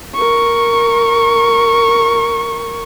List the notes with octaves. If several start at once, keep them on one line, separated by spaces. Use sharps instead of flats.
A#4 C#6